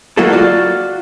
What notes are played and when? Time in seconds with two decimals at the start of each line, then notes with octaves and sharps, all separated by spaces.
0.17 F#3 G#3 A#3 E4 F#4 A4
0.33 F4 F#4 D5